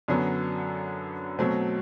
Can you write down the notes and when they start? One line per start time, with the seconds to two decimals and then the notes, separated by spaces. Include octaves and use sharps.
0.08 F#2 D3 F#3 B3
1.39 B2 F#3 A3 C4